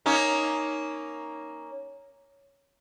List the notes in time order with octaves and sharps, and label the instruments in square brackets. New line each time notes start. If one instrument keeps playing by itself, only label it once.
[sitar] A#3 C#4 D#4